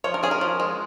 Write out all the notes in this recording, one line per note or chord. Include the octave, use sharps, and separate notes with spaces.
F3 C#5
A#4
C#4 G#4
A#4
F3
G#3